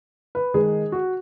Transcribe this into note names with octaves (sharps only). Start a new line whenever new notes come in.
B4
D#3 G#3 D#4 G#4
F#4